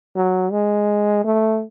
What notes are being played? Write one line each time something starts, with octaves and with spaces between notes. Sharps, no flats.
F#3
G#3
A3